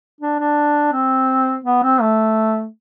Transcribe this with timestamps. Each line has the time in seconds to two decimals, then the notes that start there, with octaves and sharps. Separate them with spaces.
0.21 D4
0.40 D4
0.93 C4
1.65 B3
1.84 C4
2.01 A3